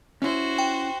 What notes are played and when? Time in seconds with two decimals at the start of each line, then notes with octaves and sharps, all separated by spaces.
0.22 C#4 E4 F#4 C5
0.58 G5